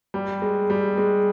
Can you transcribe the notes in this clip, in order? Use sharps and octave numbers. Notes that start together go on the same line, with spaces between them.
G3
G#3
G3
G#3